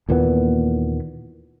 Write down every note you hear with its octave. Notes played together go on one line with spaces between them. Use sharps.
D#2 A#2 E3 B3